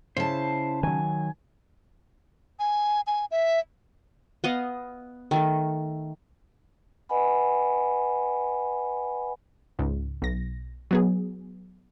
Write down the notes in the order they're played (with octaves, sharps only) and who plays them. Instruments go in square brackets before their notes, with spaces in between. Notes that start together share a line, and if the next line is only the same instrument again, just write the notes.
[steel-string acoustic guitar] C#3 A5 [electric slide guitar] E4 C5
[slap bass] D#3 F#3 [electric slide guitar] G#5
[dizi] G#5
G#5
E5
[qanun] B3 D#5 F5 F#5
D#3 A3 A4
[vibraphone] B4 D#5 F#5 G#5 B5
[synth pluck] C#2 G#2
B1 A#6
F#3 B3 G#4